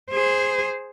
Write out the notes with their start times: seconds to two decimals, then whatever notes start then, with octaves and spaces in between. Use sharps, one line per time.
0.11 G#4 C5